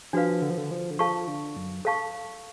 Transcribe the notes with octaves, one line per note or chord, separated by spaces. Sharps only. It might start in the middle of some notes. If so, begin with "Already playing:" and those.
F3 D4 F#4 B4 F5
D3
F3
D3
F3
D3
F3 A4 F5 A5 C#6
D3
F#2
A4 F5 A5 C#6